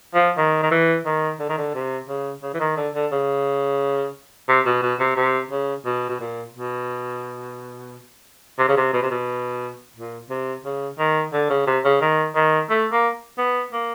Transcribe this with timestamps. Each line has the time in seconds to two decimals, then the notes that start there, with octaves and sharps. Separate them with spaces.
0.15 F3
0.37 D#3
0.63 D#3
0.71 E3
1.06 D#3
1.40 D3
1.49 D#3
1.58 D3
1.74 C3
2.08 C#3
2.43 C#3
2.54 E3
2.60 D#3
2.77 D3
2.95 D3
3.12 C#3
4.48 C3
4.66 B2
4.83 B2
5.00 C3
5.16 C3
5.50 C#3
5.85 B2
6.09 B2
6.19 A#2
6.54 B2
8.59 C3
8.69 C#3
8.77 C3
8.93 B2
9.02 C3
9.11 B2
9.96 A#2
10.30 C3
10.65 C#3
10.99 D#3
11.33 D3
11.50 C#3
11.67 C3
11.85 C#3
12.01 D#3
12.36 D#3
12.70 A3
12.92 A#3
13.38 B3
13.73 A#3